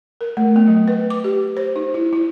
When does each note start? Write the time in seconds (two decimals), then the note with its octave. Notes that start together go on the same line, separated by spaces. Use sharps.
0.21 A#4
0.37 A3
0.56 B3
0.68 F#3
0.88 B4
1.10 D6
1.24 G4
1.57 C5
1.76 D#4
1.94 E4
2.13 E4